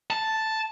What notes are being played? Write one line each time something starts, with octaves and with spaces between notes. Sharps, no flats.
A5